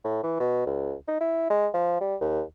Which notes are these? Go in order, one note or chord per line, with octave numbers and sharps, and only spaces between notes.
A2
E3
B2
C#2
D#4
E4
G#3
F3
G3
D#2